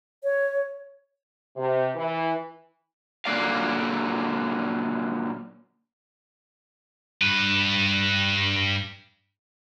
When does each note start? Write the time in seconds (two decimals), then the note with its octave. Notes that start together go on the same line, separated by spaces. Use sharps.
0.24 C#5
1.56 C3
1.96 E3
3.25 A#2 D3 F#3 A#3 D5 F5
7.22 G2 B4